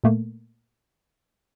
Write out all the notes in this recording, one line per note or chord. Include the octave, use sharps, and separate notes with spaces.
A#2 A3 A#3